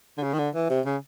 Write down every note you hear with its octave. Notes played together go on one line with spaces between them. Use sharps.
D3
C#3
D#3
D3
E3
C3
C#3